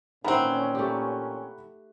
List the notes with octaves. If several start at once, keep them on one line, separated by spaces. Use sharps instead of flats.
A#2 D#3 E3 C4 C#4 F#5 A#5 B5
A3 G4